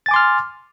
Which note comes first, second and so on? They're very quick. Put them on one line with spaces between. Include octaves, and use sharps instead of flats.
A6 G#5 D6 C6 F6